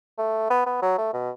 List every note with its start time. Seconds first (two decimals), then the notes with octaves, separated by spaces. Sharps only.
0.18 A3
0.50 B3
0.66 B3
0.82 F#3
0.98 A3
1.13 B2